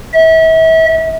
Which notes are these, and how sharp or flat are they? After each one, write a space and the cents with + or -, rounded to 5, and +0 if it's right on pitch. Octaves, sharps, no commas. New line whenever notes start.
E5 -35